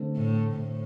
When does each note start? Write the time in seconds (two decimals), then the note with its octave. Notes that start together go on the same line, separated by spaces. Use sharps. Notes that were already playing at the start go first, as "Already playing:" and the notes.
Already playing: D3 A3 C4
0.15 A2
0.55 A2